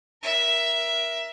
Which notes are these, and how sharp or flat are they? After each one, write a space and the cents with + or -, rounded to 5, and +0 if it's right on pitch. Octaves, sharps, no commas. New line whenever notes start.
A#4 +25 E5 +5